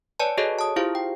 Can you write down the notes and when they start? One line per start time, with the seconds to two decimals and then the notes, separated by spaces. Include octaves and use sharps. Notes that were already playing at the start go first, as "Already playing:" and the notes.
0.20 B4 C#5 D5 G#5 A5
0.37 F#4 G#4 A4 C#5 D#5
0.59 A5 D#6
0.76 E4 F4 G4 G#4 C5 F5
0.95 G5